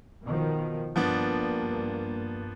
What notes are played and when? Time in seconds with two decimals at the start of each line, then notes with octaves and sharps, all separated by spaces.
0.24 B2 D#3 F3
0.96 G2 F3 A#3 B3 D4